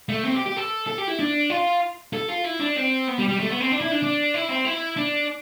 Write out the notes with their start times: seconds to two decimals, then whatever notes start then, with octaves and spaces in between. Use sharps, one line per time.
0.09 A3
0.24 C4
0.34 G4
0.46 G4
0.56 A4
0.87 A4
0.98 G4
1.08 E4
1.19 D4
1.50 F4
2.13 A4
2.29 F4
2.45 E4
2.60 D4
2.77 C4
3.08 B3
3.18 G3
3.28 G3
3.39 A3
3.50 B3
3.60 C4
3.71 D4
3.81 E4
3.92 D4
4.03 D4
4.34 E4
4.49 C4
4.65 E4
4.97 D4